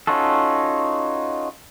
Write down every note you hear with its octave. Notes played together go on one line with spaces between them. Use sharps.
C#4 D#4 F4 F#4 A4